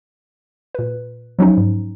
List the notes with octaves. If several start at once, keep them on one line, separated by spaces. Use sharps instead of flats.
A#2 B4
F3 F#3 C#4 D#4
G#2